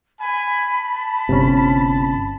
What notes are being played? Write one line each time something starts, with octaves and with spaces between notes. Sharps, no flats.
G#5 B5
A5
G1 C3 C#4